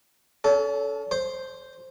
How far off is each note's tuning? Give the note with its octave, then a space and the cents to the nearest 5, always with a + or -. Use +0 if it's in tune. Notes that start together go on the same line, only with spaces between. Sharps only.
C#4 +35 A4 -15
C5 +0 C6 +0